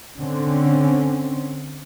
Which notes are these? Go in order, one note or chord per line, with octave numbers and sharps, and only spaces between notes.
D3 C4 C#4